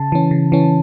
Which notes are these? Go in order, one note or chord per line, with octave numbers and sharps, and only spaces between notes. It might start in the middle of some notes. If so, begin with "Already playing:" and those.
Already playing: C#3 A5
E3 C#4
C#3
E3 C#4